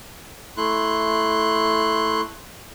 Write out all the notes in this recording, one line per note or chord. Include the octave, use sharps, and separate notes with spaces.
A3 E4 C6 F#6